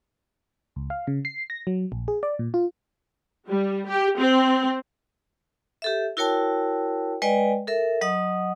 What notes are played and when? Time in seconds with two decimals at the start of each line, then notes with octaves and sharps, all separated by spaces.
0.76 C#2
0.90 F5
1.07 C#3
1.25 C7
1.50 A#6
1.67 F#3
1.92 A#1
2.08 G#4
2.23 D5
2.39 A#2
2.54 F4
3.48 G3
3.87 G4
4.19 C4
5.82 G4 A4 E5
6.17 E4 F#4 A#4 C#5 G5 A5
7.22 G#3 B4 D5 D#5 G5 G#5
7.67 A4 A#4 E5
8.01 F#3 D#5 F#5 D#6